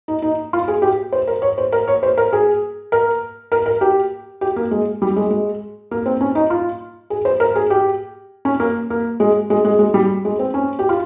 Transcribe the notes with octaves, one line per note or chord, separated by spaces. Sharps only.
D#4
D#4
F4
G#4
G4
C5
A#4
C#5
C5
A#4
C#5
C5
A#4
G#4
A#4
A#4
A#4
G4
G4
A#3
G#3
G3
G#3
G#3
A#3
C4
C#4
D#4
F4
G#4
C5
A#4
G#4
G4
C#4
A#3
A#3
G#3
G#3
G#3
G#3
G3
G#3
C4
C#4
G4
F4